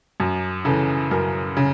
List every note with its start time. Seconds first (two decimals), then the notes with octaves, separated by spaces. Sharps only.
0.20 F#2
0.65 C#3 E3 A4
1.11 F#2 A#4
1.57 C#3